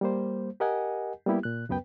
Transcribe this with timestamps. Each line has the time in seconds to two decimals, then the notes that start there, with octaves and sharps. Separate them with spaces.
0.01 G3 A#3 C5
0.60 G4 A#4 D#5 F#5 G#5
1.26 G3 A#3 B3 E4 G4
1.43 A#2 F#6
1.69 C#2 F#2 B3 B4 G5